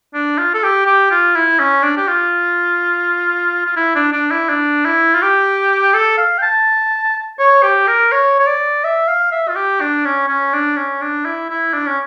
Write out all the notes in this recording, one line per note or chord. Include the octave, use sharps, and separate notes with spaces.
D4
F4
A4
G4
G4
F4
E4
C#4
D4
G4
F4
F4
E4
D4
D4
E4
D4
E4
F4
G4
A4
F5
G5
A5
C#5
G4
A#4
C#5
C#5
D5
E5
F5
E5
F4
G4
D4
C#4
C#4
D4
C#4
D4
E4
E4
D4
C#4